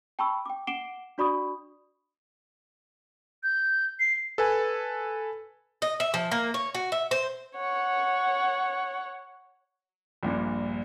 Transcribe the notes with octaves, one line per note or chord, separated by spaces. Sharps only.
G5 A5 B5 C#6 E6
G5 D6
F#5 D6 C7 D7 E7 G7
D4 F#4 D5 B5 C#6 D#6
G6
C7
A4 B4 G#5
D#5
E5
F3
A#3
C#5
F#4
E5
C5
C#5 F#5
A#1 G2 A#2